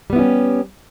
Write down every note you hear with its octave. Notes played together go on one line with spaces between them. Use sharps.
G3 B3 C#4 E4 G4